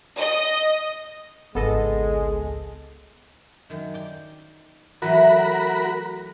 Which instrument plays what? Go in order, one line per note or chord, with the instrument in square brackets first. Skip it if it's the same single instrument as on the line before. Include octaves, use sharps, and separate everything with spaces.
[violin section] D#5
[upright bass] G#1 C#2 [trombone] G#3 [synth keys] B3 A4 D#5
[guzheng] F#2 D#3
D5 G5
[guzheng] E3 F#3 A3 [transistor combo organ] F#4 A#4 B5